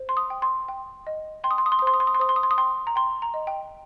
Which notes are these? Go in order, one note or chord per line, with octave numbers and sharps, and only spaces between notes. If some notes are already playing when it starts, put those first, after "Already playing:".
Already playing: C5
C6
D#6
G5
C6
G5
D#5
G5 C6
D#6
C6
D#6
C6
D#6
C5 C6
D#6
C6
D#6
C6
C5 D#6
C6
D#6
C6
D#6
G5 C6
A#5
G5 C6
A#5
D#5
G5